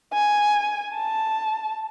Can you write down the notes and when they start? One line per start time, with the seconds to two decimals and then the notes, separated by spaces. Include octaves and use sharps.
0.13 G#5
0.96 A5